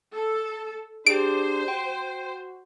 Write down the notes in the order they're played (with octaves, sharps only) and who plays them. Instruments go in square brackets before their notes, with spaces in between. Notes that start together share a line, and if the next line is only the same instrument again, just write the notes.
[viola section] A4
[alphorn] D4 [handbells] G4 G#4 [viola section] C5 [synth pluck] D7
[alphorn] F#4 [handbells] G5